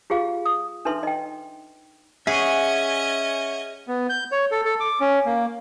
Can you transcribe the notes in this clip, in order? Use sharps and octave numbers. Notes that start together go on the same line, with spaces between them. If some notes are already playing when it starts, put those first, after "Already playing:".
F4 G4 G#4 F5
D#6
D4 D#4 A4 B4 E5 C6
D#5 G5
C#4 G#4 D#5 E5 F#5 C#6 G#6
B3
G6
C#5
A4
A4
D6
C#4
A#3